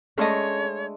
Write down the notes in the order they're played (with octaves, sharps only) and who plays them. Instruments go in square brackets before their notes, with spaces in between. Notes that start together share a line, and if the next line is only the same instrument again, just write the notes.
[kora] G#3 A3 D4 [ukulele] C#4 A4 D#5 [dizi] C#5